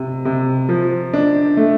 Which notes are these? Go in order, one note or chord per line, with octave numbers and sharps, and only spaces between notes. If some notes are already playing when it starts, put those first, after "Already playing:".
Already playing: C3
C3
F3
D4
A3